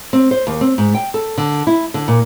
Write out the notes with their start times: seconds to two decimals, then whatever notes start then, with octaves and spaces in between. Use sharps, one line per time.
0.13 C4
0.31 C5
0.47 D#2
0.61 C4
0.78 G#2
0.94 G5
1.14 A4
1.38 D3
1.67 E4
1.94 D3
2.08 A#2